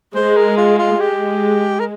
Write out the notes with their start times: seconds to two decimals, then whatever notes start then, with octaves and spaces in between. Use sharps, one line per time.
0.15 G#3 C5
0.37 A#4
0.57 F4
0.78 F4
1.00 G#3 G4
1.80 A#4